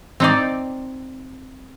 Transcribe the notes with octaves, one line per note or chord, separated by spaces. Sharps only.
C4 D#4 D5